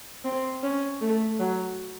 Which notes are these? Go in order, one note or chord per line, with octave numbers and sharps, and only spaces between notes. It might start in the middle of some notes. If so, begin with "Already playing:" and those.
C4
C#4
A3
F#3